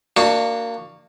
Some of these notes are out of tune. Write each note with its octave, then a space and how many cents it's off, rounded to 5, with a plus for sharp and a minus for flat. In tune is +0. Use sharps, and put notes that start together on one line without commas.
A#3 -10 D4 +20 F#4 +0